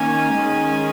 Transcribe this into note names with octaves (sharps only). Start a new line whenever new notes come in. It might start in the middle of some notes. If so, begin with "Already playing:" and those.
Already playing: D#3 A#3 C#4 G#5
D#3 G#3 C#4